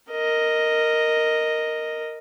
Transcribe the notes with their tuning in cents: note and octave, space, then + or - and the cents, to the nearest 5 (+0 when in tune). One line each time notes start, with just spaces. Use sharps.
A#4 -5 D#5 +0